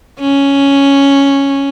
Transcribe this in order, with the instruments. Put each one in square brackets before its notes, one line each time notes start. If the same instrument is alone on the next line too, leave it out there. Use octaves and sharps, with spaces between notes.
[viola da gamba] C#4